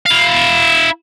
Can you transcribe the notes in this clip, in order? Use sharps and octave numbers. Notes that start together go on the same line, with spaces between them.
E4 F5